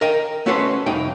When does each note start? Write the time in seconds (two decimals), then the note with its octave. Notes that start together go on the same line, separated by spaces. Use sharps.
0.01 A#4 D#5 G5
0.46 A3 C#4 F#4 A4 B4 C5
0.86 C2 F2 D#4 G5